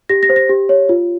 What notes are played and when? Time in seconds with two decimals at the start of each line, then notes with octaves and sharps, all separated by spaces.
0.09 G4 A#6
0.23 A#6
0.29 C5
0.36 A#6
0.49 G4
0.69 C#5
0.89 F4